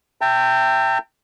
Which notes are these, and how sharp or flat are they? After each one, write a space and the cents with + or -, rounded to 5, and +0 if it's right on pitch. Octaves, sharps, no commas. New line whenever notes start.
E5 +10 G5 +0 A#5 -45